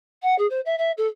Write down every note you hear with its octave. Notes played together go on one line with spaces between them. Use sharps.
F#5
G#4
C5
E5
E5
A4